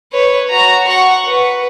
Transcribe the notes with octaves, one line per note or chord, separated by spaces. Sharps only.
B4 C#5
F#4 A#5
F#5 C#6
B4